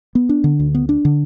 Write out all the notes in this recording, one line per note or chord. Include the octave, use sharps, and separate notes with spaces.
B3
D4
D3
D2
B3
D4
D3